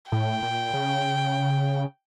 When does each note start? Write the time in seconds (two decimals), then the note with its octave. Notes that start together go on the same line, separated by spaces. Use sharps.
0.12 A2 G5
0.42 A#2
0.74 C#3